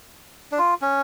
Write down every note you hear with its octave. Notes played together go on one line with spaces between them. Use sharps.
D4
F4
C#4